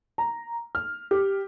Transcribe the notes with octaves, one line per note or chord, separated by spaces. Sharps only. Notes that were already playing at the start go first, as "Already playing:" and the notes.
A#5
F6
G4